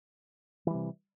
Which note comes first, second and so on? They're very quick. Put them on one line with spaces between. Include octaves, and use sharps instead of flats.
E3 G3 C3